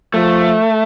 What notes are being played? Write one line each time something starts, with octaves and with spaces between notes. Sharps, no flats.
F3 A3